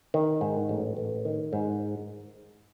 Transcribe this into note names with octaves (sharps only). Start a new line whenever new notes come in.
D#3
G#2
A1
A1
D#3
G#2